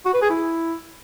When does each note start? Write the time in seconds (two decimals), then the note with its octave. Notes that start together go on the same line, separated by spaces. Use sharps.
0.06 F#4
0.14 B4
0.22 G#4
0.30 E4